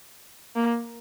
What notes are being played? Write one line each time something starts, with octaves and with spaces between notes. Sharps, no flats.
A#3